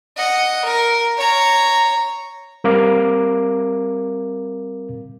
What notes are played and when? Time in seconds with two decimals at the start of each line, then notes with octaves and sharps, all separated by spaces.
0.17 D#5 F#5
0.65 A#4
1.17 C#5 A#5
2.64 G3 C4 A#4 F5 D6